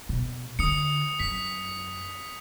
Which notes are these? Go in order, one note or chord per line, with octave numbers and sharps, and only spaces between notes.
B2
D3 D#6 C#7
F#2 B6